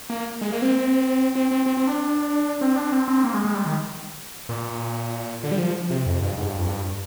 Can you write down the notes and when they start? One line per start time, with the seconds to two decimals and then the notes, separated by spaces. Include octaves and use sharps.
0.10 A#3
0.41 G#3
0.52 A#3
0.62 C4
1.35 C4
1.51 C4
1.66 C4
1.77 C4
1.87 D4
2.61 C4
2.76 D4
2.92 C4
3.08 C4
3.24 A#3
3.34 G#3
3.45 G#3
3.55 G3
3.65 D#3
4.49 A#2
5.43 D3
5.52 G3
5.59 F3
5.90 C3
6.06 F2
6.21 G2
6.37 G#2
6.47 G2
6.58 F2
6.69 G2